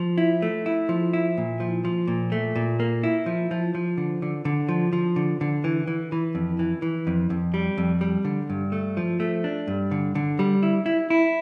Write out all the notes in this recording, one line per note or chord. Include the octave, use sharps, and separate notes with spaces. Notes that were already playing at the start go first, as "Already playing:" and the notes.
Already playing: F3
E4
A3
E4
F3
E4
A#2
F3
F3
A#2
A3
A#2
A#3
E4
F3
F3
F3
D3
D3
D3
F3
F3
D3
D3
E3
E3
E3
F2
E3
E3
F2
F2
G3
F2
G3
D3
G2
A3
F3
A3
D4
G2
D3
D3
G3
E4
E4
E4